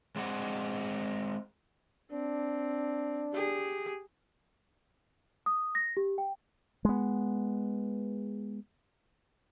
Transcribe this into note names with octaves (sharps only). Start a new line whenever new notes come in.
G#3 C4 D5 D#5 F#5
C4 D4
G4 G#4
D#6
A#6
G4
G5
G#3 B3